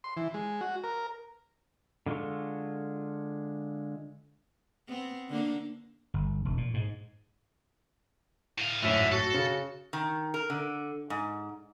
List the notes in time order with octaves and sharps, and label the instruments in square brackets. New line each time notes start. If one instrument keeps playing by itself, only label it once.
[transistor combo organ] C6
E3
G#3
F#4
A#4
[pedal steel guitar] D3 G#3 F4 A4 C#6
[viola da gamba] B3 C4
D3 A#3 D4
[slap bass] G1
E1
A#2
G#2
[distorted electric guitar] A2 F5
[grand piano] G#1 F#2 A2 [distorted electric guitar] D3 [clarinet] E5
[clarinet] F#4 [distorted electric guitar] A4
[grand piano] C#3
[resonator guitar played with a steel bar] D#3
A#4
D3
G#2